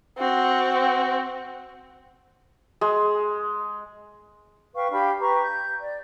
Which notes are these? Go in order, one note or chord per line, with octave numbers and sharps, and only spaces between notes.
C4 F#4
G#3
B4 F5 G5 C#6
D4 G4 F5 B5
G4 B4 A#5 C#6
G6
D5